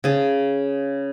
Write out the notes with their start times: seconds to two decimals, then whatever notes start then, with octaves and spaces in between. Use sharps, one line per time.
0.04 C#3 G#4 A5